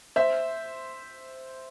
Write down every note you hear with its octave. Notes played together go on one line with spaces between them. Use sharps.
C5 E5